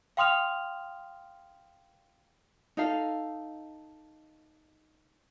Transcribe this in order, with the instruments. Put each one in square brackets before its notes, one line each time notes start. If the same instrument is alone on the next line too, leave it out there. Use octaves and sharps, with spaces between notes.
[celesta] F5 G5 C6 D#6 F6 F7
[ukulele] D#4 A4 F5